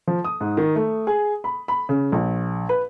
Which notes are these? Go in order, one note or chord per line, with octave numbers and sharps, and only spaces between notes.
F3
D#6
G#2
D#3
A3
G#4
B5
B5
C#3
A#1
B4